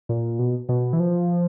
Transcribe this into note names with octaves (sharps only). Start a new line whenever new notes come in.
A#2
B2
B2
E3
F3